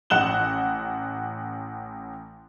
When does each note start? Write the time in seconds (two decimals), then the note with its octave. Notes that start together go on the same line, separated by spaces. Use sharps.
0.10 A1 F#5 F#6 E7 G7